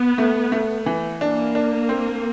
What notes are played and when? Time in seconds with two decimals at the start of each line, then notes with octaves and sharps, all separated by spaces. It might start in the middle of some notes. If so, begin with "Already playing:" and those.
Already playing: B3
0.18 A3
0.52 A3
0.86 E3
1.21 A#3 D4
1.55 D4
1.89 C4